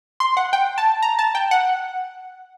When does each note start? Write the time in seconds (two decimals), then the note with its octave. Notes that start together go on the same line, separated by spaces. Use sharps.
0.20 C6
0.37 F#5
0.53 G5
0.78 A5
1.02 A#5
1.19 A5
1.35 G5
1.51 F#5